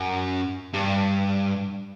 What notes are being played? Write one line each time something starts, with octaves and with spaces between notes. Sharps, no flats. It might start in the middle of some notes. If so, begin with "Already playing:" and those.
Already playing: F#2
G2